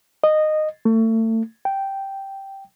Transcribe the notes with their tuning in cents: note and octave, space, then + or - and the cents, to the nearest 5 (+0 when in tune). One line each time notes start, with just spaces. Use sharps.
D#5 -15
A3 +35
G5 -5